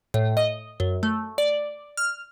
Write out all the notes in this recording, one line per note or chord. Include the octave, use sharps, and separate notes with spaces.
A2
D#5
F#2
A3
D5
F6